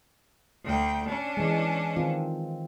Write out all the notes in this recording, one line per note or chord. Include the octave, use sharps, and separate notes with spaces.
D2 G5
C#4 D4
E3 G#3
D#3 C4 F4